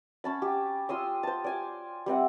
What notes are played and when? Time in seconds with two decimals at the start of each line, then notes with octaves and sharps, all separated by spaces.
0.24 C#4 A5 B5
0.42 G4
0.89 F4 C6 D#6 E6
1.23 C5 A5
1.44 D5 G#5 D6
2.06 G3 C4 E5 F#5